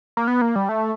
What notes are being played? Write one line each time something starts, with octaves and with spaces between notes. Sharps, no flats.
A#3
B3
A#3
G3
A3